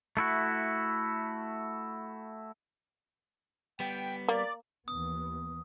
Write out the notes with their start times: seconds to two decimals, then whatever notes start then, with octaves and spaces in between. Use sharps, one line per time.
0.17 A3 E4 F#4
3.80 G3 B3 G5
4.28 A#3 D5
4.88 D#2 E3 B3 D#6